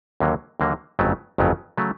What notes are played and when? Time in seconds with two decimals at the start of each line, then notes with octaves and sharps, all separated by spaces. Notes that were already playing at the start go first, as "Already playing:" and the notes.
0.20 D#2 D3 F#3 A#3
0.60 D#2 D3 F#3 A#3
0.99 G1 F2 C#3 F#3 A3
1.38 G1 F2 C#3 F#3 A3
1.77 C#3 F#3 A3